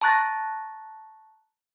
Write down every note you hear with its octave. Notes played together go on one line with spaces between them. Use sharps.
A5 A#5 C#6 F#6 A6 A#6